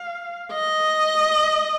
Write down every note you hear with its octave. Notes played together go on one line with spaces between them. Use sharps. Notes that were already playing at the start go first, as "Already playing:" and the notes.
Already playing: F5
D#5